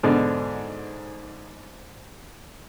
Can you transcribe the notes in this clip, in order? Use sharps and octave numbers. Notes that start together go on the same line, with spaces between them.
G#2 B2 D3 D4